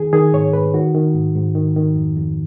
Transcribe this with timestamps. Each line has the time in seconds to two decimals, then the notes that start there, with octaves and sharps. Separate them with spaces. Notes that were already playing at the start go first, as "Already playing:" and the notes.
Already playing: D#3 G#4
0.13 D#3 G#4
0.33 G#2 C#5
0.53 G#2 B4
0.74 D#3 F#4
0.95 D#3
1.15 G#2
1.35 G#2
1.55 D#3
1.76 D#3
1.96 F2
2.16 F2